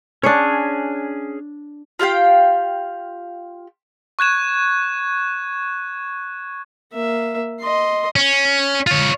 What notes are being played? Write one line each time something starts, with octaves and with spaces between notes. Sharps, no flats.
C#4 D4 G#4 C#5
F4 G4 F5 G5
C#6 F#6 G#6 E7
A#3 E5
D#5 C6
C#4
F4 C#5